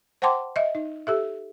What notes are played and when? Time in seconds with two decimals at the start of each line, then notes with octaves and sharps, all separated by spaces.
0.22 C5 F#5 G5 A5 C6 D6
0.56 D#5 E5
0.75 D#4
1.07 G4 A4 E5